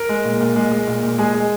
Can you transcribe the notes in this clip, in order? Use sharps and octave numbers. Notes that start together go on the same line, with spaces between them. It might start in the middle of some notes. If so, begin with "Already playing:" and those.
Already playing: A#4
G#3
A#2
A#2
G#3
G#3
A#2
A#2
G#3 G#4
G#3